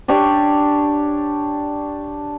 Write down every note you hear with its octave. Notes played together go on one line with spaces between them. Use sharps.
D4 G4 C#5 D5